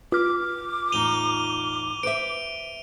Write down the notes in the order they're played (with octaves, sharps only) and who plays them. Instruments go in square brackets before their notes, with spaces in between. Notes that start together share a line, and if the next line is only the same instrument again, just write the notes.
[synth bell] F4 F6 [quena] D6
[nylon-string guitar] E2 A2 D#4 [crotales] D#7 F7 G7
[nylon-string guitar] B4 C5 E5 [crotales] D7